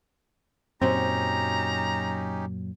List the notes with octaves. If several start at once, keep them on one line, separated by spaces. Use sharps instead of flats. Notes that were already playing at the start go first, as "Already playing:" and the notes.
F#2 A#2 F#3 C4 C#4 D#4 G4 A#5